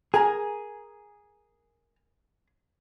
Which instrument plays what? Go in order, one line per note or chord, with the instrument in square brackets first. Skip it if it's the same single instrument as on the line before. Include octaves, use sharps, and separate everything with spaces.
[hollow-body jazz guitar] G#4 [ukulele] A#4 G#5 A#5